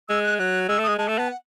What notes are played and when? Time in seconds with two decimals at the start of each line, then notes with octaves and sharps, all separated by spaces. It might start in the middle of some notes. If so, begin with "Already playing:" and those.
0.09 G#3 E6
0.24 F#6
0.39 F#3 F#6
0.69 G#3 E6
0.78 A3
0.84 G#3 D#6
0.98 G#3 A5
1.08 A3
1.18 B3 A5
1.28 F#5